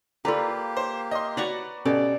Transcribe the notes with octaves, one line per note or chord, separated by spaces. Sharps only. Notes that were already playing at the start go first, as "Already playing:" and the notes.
A#3 F4 G4 A4 B4 D5 A#5
C5
D#5 C6
F#4 B4 C#5 D5 A#5 C#6
B2 C#4 G4 A4 D5